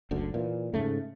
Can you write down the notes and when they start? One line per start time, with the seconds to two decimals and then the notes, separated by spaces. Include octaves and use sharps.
0.11 F#1 D2 D3
0.34 A#2 E3
0.74 G#2 C#3 A3